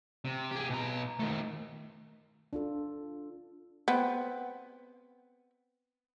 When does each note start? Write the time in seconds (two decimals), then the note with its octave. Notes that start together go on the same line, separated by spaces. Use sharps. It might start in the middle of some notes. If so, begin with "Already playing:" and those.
0.25 C3
0.51 G4 G#4
0.70 B2 A#5
1.19 D#3 A3
2.53 D4 F4 A4
3.88 B3 C4